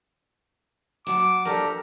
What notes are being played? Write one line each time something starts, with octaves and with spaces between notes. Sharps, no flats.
F#3 F#5 A5 D6
F3 D4 G4 A4 A#4 A#5